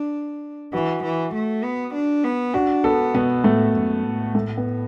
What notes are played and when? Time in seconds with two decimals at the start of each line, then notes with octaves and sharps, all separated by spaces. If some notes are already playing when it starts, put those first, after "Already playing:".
Already playing: D4
0.73 E3 F#4
1.04 E3
1.34 A3
1.63 B3
1.94 D4
2.24 B3
2.54 D4 F#4
2.84 B3 A4
3.14 B2 B3
3.44 A2 A3
3.75 F#2
4.04 A2
4.35 A3
4.57 B3